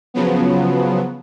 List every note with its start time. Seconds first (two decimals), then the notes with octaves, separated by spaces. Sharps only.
0.14 C#3 F3 F#3 B3